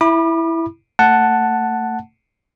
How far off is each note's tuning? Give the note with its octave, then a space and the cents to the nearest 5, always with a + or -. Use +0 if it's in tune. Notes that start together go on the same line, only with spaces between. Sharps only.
E4 +0 B5 -25 D6 +40
A3 +30 F#5 +0 A5 +0